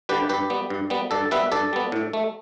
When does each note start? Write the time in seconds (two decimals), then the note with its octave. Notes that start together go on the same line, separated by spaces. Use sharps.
0.09 D3 G3 G4 B4
0.29 G2 G4 B4
0.50 G3 B3
0.70 G2
0.90 G3 B3
1.11 G2 A4 D5
1.31 G3 B3 B4 E5
1.52 G2 A4 D5
1.73 G3 B3
1.92 A2
2.13 A3